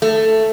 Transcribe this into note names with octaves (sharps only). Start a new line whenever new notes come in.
A3